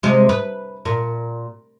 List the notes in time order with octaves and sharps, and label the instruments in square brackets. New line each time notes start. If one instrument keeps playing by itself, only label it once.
[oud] C3 G#3
B4
A#2